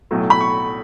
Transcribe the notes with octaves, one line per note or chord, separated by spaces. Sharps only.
B1 A2 F#3 A3
B5
C#6